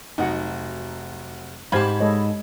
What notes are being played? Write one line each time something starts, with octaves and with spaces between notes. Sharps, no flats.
F1 F#3 D#4 D#5 F#5
G#2 G4 C5 F5 A5 B5 G#6
G#3 A4 C#5 D#5